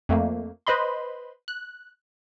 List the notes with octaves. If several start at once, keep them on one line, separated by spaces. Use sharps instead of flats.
F2 A3 A#3
B4 C5 D#5 B5 C6
F#6